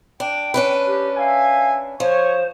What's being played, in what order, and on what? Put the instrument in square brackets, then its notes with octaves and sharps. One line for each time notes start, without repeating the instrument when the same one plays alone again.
[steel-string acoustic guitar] D4 [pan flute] G5
[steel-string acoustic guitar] C#4 D4 B4
[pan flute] G4
[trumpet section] E5 G#5 [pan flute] F5
[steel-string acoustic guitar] F3 [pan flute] C5 [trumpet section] C#5